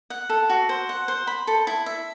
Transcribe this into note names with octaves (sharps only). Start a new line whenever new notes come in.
F#5
A4
F#4
C5
F#5
C5
B5
A4
E4
E5